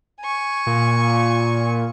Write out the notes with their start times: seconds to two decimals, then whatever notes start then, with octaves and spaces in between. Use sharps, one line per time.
0.21 G#5 C#6
0.67 A#2